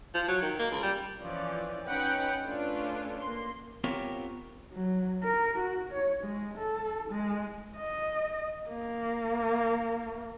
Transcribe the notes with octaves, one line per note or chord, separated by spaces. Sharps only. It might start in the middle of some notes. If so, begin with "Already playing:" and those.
F3
F#3
D#3
A#3
C#2
G3
E3 F3 C#4 D5
C#4 D#4 B4 F#5 G5 B5
A3 C#4 D4 F4 B4
A#3 C6
B3 C4 F4 G4 A#4 C#5
F#3
A#4
F#4
C#5
G#3
A4
G#3
D#5
A#3